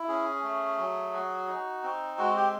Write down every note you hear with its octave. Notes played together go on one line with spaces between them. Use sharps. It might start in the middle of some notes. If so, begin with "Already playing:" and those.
Already playing: E4
C#4 G#4
A3
F#3
F#4
D#4
C4
G#3 F#4
G4